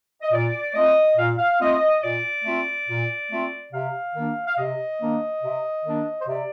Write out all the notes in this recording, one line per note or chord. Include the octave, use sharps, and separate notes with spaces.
D#5
A#2 D5
A3 C4 F4 D#5
A#2 F5
F5
A3 C4 F4 D#5
A#2 D5
A3 C4 F4
A#2
A3 C4 F4
C3 F5
D#3 A#3 D4
F5
C3 D#5
D#3 A#3 D4
C3
D#3 A#3 D4
C5
C3 D5